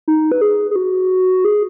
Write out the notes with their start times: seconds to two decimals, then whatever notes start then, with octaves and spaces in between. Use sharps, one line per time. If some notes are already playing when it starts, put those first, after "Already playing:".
0.08 D#4
0.32 B4
0.41 G#4
0.71 G#4
0.76 F#4
1.45 G#4